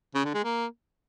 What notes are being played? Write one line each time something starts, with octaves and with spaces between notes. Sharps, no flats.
C#3
D3
G#3
A#3